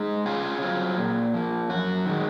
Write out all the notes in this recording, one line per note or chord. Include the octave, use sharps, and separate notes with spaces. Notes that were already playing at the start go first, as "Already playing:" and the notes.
Already playing: G#3 D#4
C#3 F4 G#4
F#3 C4 F4
A#2
F3 A#3
F#2 F#4
D#3 G#3